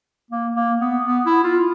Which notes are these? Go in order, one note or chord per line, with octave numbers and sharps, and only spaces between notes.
A#3
A#3
B3
B3
E4
F4